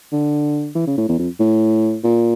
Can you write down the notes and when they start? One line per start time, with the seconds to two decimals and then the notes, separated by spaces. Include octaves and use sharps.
0.12 D3
0.75 E3
0.87 C#3
0.98 A2
1.08 E2
1.19 F2
1.40 A2
2.04 A#2